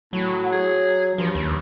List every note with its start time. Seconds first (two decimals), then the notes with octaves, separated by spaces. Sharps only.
0.13 A2 F#3
0.52 G#4
1.18 G2 F3
1.35 D#2